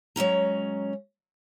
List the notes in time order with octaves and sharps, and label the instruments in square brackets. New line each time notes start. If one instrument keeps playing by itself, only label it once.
[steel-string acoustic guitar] F#3 G#3 C#4 A#5